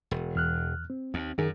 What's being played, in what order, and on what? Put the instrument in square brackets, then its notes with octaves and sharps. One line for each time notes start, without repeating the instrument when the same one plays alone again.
[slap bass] E1
[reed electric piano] E2 F6 F#6
C4
[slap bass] D#2
[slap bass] F#2 [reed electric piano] D#3 G#4 A#4